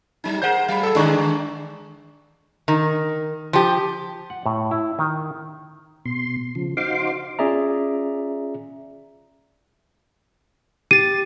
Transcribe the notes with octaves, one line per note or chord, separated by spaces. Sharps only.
F#3 G3 D#4
G#4 A#4 C5 F#5 G6
F#3 F5 B5
A4 E6
G#2 D3 D#3 G#3 D4 C#6
D#3
F3 G4
F#5
A2
E4
D#3
B2 C6
C#3 F3
D#4 F#4 C5 F5 C6 D6
C#4 F4 G#4 D5 E5 A#5
G4 A6 D#7